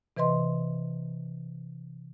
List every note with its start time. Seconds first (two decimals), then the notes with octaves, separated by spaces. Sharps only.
0.17 C3 E3 B4 D#5 C6